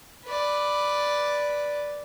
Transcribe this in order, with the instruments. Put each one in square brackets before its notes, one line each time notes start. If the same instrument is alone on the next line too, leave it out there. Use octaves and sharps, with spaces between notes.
[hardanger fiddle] B4 D5